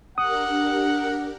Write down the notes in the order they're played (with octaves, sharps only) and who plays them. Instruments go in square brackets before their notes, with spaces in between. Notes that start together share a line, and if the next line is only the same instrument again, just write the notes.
[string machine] D4 G4 A#4 [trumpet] F#5 [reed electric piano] D#6